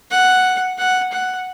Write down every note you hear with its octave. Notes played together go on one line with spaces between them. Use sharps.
F#5
F#5
F#5